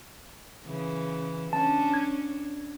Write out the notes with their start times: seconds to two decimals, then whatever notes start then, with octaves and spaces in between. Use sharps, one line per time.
0.65 C#3 E3
1.53 C#4 D4 A5
1.94 G#6